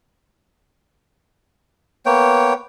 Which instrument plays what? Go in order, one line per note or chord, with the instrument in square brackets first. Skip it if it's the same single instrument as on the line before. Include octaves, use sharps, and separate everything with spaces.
[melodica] A#3 B3 C#5 G5